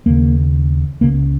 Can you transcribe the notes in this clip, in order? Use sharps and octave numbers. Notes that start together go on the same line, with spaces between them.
D#2 C#3 A#3
C#2 C#3 A#3